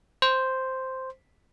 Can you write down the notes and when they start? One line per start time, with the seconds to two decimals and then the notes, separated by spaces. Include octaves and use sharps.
0.22 C5